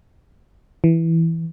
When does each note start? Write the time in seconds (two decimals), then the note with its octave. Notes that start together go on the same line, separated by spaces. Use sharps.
0.84 E3